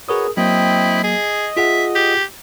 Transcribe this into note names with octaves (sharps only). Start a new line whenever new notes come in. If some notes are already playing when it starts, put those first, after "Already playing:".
F#4 G#4 A#4 B4 C#5 D#6
F#3 A#3 C4 E4 D#5 G5
G#4 D#5
F4 G#4 E5 F#5
G4